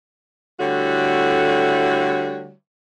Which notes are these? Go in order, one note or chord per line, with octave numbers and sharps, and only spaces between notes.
D3 G3 A3 E4 F#4 C#5